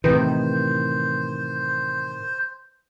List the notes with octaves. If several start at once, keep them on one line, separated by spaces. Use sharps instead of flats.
A2 C3 D#3 E3 B4 C5